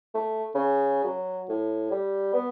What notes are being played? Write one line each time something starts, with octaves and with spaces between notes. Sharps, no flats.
A3
C#3
F#3
A2
G3
B3